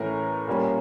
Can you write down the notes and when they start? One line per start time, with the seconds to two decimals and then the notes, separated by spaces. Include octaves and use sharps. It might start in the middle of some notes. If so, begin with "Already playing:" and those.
Already playing: A2 E3 A3 C#4 A#4
0.47 A#2 G3 A#3 C#4